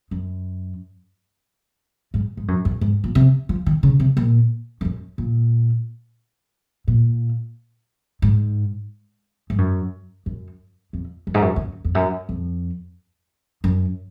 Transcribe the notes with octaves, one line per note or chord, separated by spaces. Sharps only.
F#2
G#2
G#2
F#2
F#2
G#2
A#2
C3
F3
D#3
C#3
C3
A#2
F2
F#2
A#2
A#2
G#2
G#2
F#2
F#2
F2
F#2
G#2
F#2
F2
F#2
F2
F#2
F2
F#2